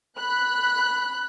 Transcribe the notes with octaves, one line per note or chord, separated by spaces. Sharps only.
B5 F#6